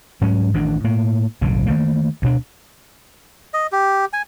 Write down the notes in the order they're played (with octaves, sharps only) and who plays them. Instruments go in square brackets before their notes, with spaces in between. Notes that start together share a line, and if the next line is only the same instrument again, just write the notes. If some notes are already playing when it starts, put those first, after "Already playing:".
[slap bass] G#2 F#3 C#4
A1 D#3 D4
A2 A#3
F#1 B1 A2 D3
D#3 F3 A3 A#3
D2 B2 D4
[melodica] D#5
G4
G#5